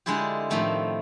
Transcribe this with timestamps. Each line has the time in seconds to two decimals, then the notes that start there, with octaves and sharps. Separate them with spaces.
0.06 D3 G#3 D4 E4 F4 G4
0.50 A2 D#3 F3 A3 C4